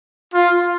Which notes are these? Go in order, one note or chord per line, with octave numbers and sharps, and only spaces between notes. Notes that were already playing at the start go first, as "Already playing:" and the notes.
F4